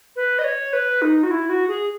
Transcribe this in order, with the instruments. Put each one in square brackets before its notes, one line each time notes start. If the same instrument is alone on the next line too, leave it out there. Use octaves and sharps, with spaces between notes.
[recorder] B4
D#5
C#5
B4
D#4
F#4
E4
F#4
G#4